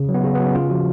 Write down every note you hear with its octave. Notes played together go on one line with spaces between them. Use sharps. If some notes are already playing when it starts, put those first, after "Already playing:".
Already playing: C#3
F#3
B3
C#3 C#4
B3
F#3
C#4
C#3 F4
F3 F#4